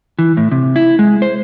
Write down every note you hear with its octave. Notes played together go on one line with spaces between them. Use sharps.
E3
A2
C3
E4
G#3
C5